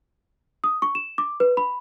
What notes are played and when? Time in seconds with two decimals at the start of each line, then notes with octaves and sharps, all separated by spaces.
0.64 D#6
0.82 C#6
0.95 E7
1.18 D6
1.40 B4
1.57 B5